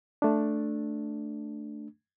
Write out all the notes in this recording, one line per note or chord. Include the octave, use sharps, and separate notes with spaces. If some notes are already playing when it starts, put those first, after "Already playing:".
A3 D4